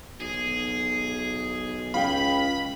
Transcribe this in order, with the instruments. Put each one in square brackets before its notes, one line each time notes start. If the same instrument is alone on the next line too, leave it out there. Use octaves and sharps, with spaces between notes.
[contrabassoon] B1 [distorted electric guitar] G#4
[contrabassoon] C#2 [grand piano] F5 G5 [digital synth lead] B5